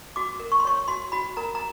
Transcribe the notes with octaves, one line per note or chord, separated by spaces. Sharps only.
F#4 D6
A#4
C#6
C6
C#5 C#6
F#4 C6
F#4 B5
A#4 A#5
A#5